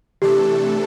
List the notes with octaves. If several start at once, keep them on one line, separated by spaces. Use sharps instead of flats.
C3 E3 A3 D4 G4 A4